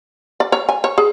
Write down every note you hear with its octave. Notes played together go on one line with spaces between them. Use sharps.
D5
C#5
G#5
C#5
G#4